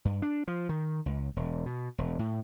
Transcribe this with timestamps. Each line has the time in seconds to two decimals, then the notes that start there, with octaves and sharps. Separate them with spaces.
0.05 G2
0.22 D4
0.48 F3
0.69 D#3
1.06 C#2
1.36 E1
1.66 B2
1.98 E1
2.19 A2